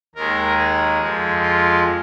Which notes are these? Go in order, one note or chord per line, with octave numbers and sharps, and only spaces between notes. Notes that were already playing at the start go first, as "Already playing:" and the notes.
D#2 D#3 G#3 A#4
G#4
F2 F3 G#3
F4